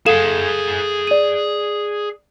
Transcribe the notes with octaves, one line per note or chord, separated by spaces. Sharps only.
G#4 A4 F5 F#5 E7
D5 D#7